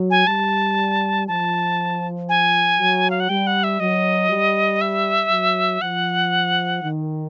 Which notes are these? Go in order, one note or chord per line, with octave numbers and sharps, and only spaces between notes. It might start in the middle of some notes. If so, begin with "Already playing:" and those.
Already playing: F#3
G#5
G3 A5
F3 A5
G#5
F#3
F5
F#5
G3 G5
F#5
E5
F#3 D#5
G3
E5
F#3
F3 F#5
D#3